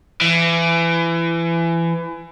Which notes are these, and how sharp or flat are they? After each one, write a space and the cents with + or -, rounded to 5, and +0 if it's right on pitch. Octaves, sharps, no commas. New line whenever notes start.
E3 +25